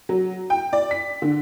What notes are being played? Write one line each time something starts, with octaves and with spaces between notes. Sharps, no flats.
F#3
G5
D5
B6
D3